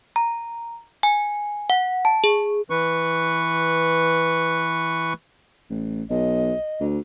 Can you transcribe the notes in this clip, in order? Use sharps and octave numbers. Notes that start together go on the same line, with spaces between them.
A#5
G#5
F#5
A5
G#4
E3 B4 C#6
A1
B1 D#5
D2